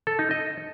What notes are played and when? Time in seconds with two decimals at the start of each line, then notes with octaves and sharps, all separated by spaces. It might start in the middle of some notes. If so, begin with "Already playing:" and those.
0.07 A4
0.19 D#4
0.31 D#5